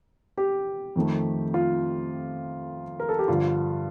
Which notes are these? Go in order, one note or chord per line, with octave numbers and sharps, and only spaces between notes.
G4
F2 D#3 A3
F4
A#4
A4
G4
G2 D3 F3 F4